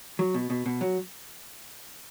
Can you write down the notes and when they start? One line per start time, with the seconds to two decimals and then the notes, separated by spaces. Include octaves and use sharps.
0.19 F#3
0.34 B2
0.50 B2
0.66 B2
0.81 F#3